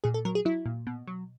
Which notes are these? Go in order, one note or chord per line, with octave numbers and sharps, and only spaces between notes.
A#2 G#4
A4
F#3 A#4
G#4
F#3 E4
A#2
B2
F#3